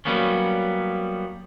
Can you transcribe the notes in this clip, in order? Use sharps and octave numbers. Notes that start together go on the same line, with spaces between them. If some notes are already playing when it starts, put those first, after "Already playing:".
F#3 G3 A#3 B3 C#4